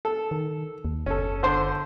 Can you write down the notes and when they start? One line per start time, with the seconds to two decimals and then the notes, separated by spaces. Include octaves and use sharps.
0.05 A4
0.31 D#3
0.85 D#2
1.06 F#1 C#4 A4
1.43 D3 C5 C6